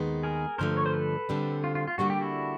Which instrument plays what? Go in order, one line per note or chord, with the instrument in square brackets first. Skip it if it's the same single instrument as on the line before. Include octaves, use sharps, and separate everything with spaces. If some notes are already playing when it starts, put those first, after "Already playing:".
Already playing: [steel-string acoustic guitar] D#2 D#3 G#3 B3
[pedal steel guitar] G#4 A#4
[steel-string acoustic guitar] G2 D3 F3 A3 [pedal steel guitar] A#4 C5
[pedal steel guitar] C#5
C5
A4 B4
[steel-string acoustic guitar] D3 G3 C4
[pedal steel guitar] F4
F4
F4
[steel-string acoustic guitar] D3 G3 A#3 D4 [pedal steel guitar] F#4
[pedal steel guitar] G4
E4 F#4